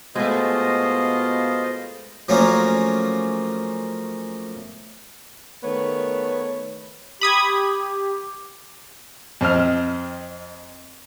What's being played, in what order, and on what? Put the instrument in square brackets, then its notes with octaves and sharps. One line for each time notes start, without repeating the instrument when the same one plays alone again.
[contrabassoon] B2 [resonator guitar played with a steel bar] G#3 A3 [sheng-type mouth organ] F4 C5 D#5
[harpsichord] F3 F#3 A3 A#3 C#4
[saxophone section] D#3 A3 B3 C#5
[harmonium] G4 [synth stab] B5 D#6 G#6
[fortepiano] F2 C4 D#5 F6